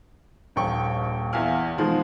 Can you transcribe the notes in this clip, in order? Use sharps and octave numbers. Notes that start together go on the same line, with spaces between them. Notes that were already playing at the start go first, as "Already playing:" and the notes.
D#1 A#1 G5 C#6
E2 E4 F5 G#5 F6
B2 D#3 F3 G#3